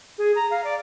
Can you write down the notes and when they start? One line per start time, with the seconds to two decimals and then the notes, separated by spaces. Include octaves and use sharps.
0.18 G#4
0.35 A#5
0.50 F5
0.64 D5